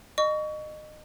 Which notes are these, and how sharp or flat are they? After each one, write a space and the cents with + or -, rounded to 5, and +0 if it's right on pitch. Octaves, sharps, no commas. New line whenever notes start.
D#5 -25 C#6 +25